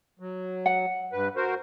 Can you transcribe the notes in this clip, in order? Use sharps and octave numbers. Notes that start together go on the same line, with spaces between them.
F#3
F#5
G2 B4
F#4 A#4 C5